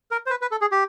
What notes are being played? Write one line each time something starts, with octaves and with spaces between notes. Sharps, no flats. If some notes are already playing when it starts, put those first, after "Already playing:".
A#4
C5
B4
B4
A4
G#4
G4